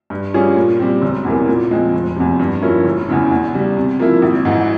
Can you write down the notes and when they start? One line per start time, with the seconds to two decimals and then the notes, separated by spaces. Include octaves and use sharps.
0.10 G2
0.34 G3 C#4 F4 G#4
0.56 A#2
0.79 G3 C4
1.02 E1
1.25 E2 C3 E3 A#3
1.47 A#2
1.71 F3 G#3 C4
1.93 F1
2.16 E2 C3
2.39 G2
2.62 F3 A#3 C#4 E4
2.85 E1
3.08 E2 C#3 E3
3.31 E2
3.53 C#3 G3
3.77 C3
3.99 F3 A#3 E4
4.22 G#1
4.45 G#2 E3